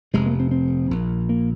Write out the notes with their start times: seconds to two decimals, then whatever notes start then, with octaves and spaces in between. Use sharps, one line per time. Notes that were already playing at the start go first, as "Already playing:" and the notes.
0.13 F1 F2 C3 G#3
0.26 A#3
0.39 C4
0.51 C4
0.91 A#1 A#2
1.29 A#3